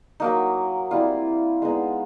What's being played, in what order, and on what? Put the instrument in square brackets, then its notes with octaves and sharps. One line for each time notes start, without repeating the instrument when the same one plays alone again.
[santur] F#3 A#3 D#4
G3 C4 E4 F4
G#3 B3 D#4